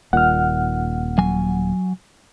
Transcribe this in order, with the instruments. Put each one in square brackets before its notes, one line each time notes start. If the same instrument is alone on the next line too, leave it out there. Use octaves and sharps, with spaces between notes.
[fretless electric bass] D#1 A#2 [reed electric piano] F#5 F6
[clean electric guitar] F#3 G#5